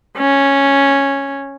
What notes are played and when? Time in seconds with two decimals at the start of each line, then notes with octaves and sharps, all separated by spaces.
0.18 C#4